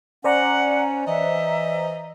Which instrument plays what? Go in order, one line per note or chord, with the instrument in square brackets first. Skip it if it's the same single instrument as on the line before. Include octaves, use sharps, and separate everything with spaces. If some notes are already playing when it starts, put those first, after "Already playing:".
[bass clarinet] C#4 [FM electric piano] C5 D5 A#5 [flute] F#5
[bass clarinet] E3 [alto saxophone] D#5 [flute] E5